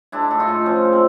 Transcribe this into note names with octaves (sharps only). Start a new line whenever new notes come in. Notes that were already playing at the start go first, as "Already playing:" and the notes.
G#3 D4 E4
A2
D#4 F4
A2
F3 C#4
G#3
C4